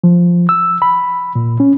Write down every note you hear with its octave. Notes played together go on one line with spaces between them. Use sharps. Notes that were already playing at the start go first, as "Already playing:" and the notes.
F3
E6
B5
A#2
C#4